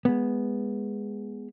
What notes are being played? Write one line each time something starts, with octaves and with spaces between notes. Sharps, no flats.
G#3 B3